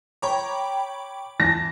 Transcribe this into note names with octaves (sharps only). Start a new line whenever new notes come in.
C#5 G5 A#5 B5 D6
E3 A5 A#6